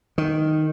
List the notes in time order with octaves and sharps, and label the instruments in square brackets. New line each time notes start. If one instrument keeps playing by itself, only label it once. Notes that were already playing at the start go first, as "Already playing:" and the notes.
[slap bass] D#3